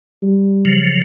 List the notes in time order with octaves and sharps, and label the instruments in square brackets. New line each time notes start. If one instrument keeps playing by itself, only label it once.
[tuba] G3
[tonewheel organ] C#3 F3 F#3